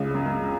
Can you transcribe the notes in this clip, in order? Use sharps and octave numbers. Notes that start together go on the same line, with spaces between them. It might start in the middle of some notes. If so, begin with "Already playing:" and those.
Already playing: C#2 C#3
F#2
F#2